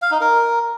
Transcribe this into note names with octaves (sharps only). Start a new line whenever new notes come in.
F5
D#4
A#4